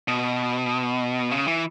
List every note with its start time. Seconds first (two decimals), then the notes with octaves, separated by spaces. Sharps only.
0.08 B2
1.31 C#3
1.47 E3